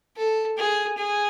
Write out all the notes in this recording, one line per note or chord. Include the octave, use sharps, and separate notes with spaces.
A4
G#4
G#4